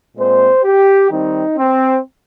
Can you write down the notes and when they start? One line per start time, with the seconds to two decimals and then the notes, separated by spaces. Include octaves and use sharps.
0.17 A#2 G#3 C4 C5
0.64 G4
1.11 D#3 G3 C4 D#4
1.57 C4